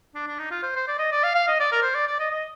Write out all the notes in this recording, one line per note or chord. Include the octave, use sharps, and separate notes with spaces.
D4
D4
D#4
F4
C5
C5
D5
D#5
D5
F5
F5
D#5
D5
A#4
C5
D5
D5
D#5
D#5